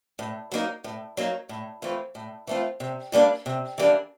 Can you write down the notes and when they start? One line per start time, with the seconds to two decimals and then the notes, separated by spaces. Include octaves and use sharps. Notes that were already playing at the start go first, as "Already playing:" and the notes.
0.19 A2
0.52 F#3 A#3 D#4
0.84 A2
1.17 F#3 A#3 D#4
1.49 A2
1.82 E3 A3 C4 F4
2.15 A2
2.47 E3 A3 C4 F4
2.80 C3
3.12 E3 G3 A#3 D4
3.46 C3
3.78 E3 G3 A#3 D4